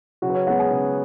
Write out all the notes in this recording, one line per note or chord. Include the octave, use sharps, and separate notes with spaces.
C#3 F#3 F#4
B4
C#4 C#5
G#3 B3 F#4 F#5
G#4 G#5
C#3